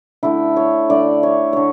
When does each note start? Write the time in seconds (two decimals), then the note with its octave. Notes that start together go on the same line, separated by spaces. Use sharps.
0.23 D3 A3 E4
0.56 C#5
0.89 D3 A3 D5
1.23 C#5
1.53 D3 C#5